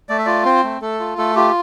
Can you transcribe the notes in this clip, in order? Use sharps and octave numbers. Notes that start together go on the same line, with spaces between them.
A3 D5
E5
F4 D5
C4 C5
A3
A3 A4
F4
A3 A4
F4 G4